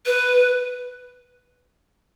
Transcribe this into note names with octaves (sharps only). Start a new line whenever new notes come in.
B4